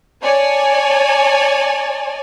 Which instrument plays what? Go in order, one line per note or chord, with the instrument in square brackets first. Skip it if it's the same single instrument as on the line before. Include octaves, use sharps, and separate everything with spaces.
[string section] C#5 D5 G#5 A5